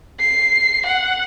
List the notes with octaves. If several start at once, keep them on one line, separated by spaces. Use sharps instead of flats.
C7
F#5